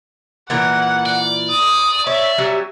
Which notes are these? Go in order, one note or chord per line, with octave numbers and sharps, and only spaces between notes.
A#2 E3 A#4 F#5
D5
D#6
C#5 E5
F#3 G3 C#4